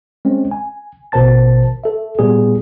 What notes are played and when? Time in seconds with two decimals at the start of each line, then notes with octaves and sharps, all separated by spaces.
0.25 G#3 C4 C#4
0.51 G#5
1.12 A1 B2 A#4 C5 A5 A6
1.84 A4 E5
2.19 A#2 G3 B3 G#4